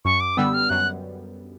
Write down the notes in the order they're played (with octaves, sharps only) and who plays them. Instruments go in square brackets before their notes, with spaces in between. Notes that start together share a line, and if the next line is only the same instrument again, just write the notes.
[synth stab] F#2 [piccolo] C#6
[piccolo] D6
[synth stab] D3 G3 B3 [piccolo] E6
[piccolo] F6
[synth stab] F#2 [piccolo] F#6